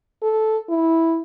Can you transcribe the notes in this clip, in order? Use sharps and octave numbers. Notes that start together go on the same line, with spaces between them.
A4
E4